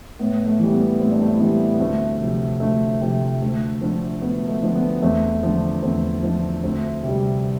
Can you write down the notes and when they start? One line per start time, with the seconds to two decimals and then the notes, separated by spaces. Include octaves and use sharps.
0.19 A2 B3
0.46 A3
0.59 E3 G3
0.73 B3
1.00 A2 C4
1.11 D4
1.21 A3 C4
1.33 E4
1.40 E3 G3 B3 D4
1.74 B3
1.80 D2 A3 C4
2.20 C3 F3
2.60 D2 A3
3.01 C3 F3
3.42 D2
3.81 D3 F3
4.22 D2 B3
4.48 A3
4.62 D3 F3
4.75 B3
5.02 E2 A3 C4
5.43 D3 F3
5.82 E2 A3 C4
6.23 D3 F3
6.63 D2 A3 C4
7.03 C3 G3